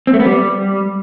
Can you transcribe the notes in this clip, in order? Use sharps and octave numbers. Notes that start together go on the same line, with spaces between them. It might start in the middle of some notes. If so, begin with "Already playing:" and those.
C4
A3
B3
G3